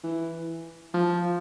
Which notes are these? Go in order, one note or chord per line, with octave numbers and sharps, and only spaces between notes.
E3
F3